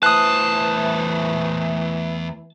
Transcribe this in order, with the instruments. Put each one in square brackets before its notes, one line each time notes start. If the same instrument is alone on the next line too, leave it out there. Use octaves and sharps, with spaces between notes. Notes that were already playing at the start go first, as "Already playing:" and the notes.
[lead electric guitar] E2 C5 [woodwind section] E3 A3 [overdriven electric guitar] A5 [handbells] D#6 F#6